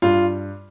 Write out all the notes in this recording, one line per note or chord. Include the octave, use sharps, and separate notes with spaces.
G2 F4